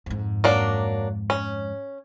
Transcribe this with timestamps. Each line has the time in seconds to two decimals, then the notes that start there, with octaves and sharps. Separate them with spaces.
0.06 F2 G#2
0.44 F#3 A#3 D4
1.30 C#4